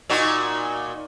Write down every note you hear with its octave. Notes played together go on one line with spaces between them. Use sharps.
A#2 D#4 F#4